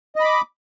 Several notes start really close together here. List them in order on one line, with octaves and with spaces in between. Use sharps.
D#5 B5 D6